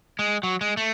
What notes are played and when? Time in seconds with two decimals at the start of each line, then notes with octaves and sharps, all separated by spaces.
0.19 G#3
0.43 F#3
0.61 G#3
0.77 A3